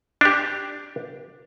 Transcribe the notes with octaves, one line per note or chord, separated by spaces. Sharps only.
D4 G4